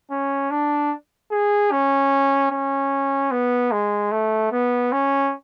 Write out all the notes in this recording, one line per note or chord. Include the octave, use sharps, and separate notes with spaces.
C#4
D4
G#4
C#4
C#4
B3
G#3
A3
B3
C#4